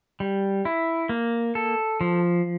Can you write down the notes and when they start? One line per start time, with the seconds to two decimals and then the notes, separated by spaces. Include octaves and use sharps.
0.20 G3
0.65 E4
1.09 A#3
1.55 A4
2.01 F3